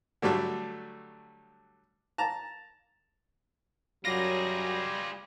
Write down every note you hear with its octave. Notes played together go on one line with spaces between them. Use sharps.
D3 F#3 G3 A3
A5 A#5
F#2 F#3 G3 F4 G#4 A#6